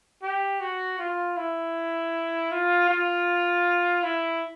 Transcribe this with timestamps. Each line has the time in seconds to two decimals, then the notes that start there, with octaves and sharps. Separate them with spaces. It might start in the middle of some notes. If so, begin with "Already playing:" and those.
0.22 G4
0.60 F#4
0.99 F4
1.37 E4
2.51 F4
2.89 F4
4.03 E4